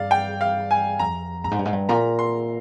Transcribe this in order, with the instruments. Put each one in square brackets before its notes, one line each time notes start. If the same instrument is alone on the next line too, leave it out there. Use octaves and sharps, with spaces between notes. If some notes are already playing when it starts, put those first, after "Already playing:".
Already playing: [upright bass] G2 [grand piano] D5 F5
[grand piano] G5
F5
G#5
[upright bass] F2 [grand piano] A#5
[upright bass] G2 [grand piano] A#5
[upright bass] G#2
G2
G#2
G2
[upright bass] A#2 [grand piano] A#5
[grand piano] C6